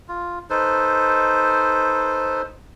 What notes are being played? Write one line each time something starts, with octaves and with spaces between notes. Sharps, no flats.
F4
D#4 A4 B4 C5